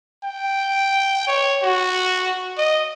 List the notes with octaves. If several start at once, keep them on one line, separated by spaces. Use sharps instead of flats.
G5
C#5
F#4
D#5